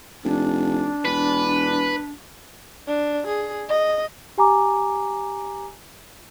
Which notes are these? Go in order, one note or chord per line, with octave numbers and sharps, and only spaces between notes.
F1 D4
E1 B4
D4
G#4
D#5
G4 G#5 A#5 D6